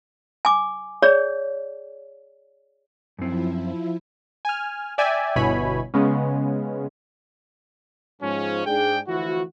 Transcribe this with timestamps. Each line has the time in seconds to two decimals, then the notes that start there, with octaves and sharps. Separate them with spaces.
0.45 G#5 D6
1.02 G#4 C#5 D5
3.19 F#2 F3 C4 E4
4.45 G#5 F6
4.98 D5 E5 G5 G#5
5.36 G1 B2 E4 C#5 G#5 B5
5.94 C#3 G#3 B3 C#4
8.22 G#2 F3 C#4
8.66 G#2 D4 G#4 G5
9.08 D2 E3 F3 E4 F#4